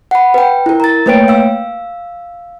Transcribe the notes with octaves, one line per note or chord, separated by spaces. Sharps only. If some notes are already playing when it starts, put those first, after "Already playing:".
F#5 B5
B4 G5
E4 A#4
A#5 A6
A3 A#3 B4 C#5 G5 D7
F5 E6